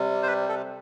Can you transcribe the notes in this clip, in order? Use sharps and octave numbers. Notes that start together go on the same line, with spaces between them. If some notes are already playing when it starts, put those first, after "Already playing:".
Already playing: C3 G3
C5
B4
A4